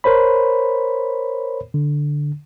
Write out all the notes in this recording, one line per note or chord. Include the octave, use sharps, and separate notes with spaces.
A#4 C5 C#5 B5
D3